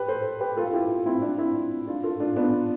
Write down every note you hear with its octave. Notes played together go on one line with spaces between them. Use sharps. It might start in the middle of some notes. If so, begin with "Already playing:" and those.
Already playing: G4 B4
A4 C5
G4 B4
F4 A4
F4
E4 G4
C4 E4
D4 F4
C4 E4
D4 F4
F4 A4
D4 F4
B3 D4